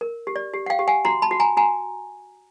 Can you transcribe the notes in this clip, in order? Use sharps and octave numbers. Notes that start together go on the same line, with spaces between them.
A#4
G4
D5
G4
F#5
F5 G5
G4
F#5 G#5
F#4 A#5 C6
A5 B5
F#4
G#5 A#5
F#4 G#5 A#5